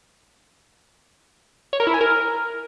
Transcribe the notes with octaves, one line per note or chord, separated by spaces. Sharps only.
C#5
A#4
E4
G#5
A#4